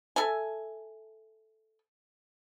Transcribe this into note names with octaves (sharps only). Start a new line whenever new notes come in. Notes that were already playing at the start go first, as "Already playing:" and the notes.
A4 E5 G#5